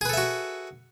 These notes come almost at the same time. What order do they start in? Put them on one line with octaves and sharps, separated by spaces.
G#4 B4 A4 E5 F#4